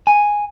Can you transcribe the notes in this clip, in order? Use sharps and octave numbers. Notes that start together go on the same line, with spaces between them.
G#5